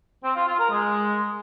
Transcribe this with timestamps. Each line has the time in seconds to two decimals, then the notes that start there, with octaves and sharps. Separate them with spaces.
0.23 C4
0.35 F4
0.47 F4
0.59 A#4
0.70 G#3